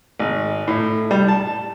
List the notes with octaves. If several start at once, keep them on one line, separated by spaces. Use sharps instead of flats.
G#1
A2
G3
A5